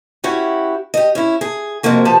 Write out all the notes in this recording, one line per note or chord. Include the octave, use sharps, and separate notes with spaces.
C#4 E4 F#4 G4
G4 D#5
C#4 E4
G#4
F2 C3 G#3 A#3 F#4
F3 B3 G4 A5